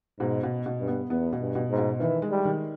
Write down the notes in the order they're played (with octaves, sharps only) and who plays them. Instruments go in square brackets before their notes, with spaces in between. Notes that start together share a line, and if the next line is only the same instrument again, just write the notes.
[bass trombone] G#2 [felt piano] B2
[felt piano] B2
B2
[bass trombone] G2
[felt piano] B3
[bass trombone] E2 [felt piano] B3
[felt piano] B2
[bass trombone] G2
[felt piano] B2
[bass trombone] G#2
[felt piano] B2
[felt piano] D#3 [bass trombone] E3
[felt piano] G#3
[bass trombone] G3
[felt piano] D#3